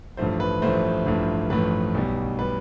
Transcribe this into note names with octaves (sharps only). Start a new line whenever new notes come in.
A1 G2 F3 A3 C5
B4
A1 G2 F3 A3 C5
A1 G2 F3 A3
A1 G2 F3 A3 B4
B1 B2 G3
B2 G3 B4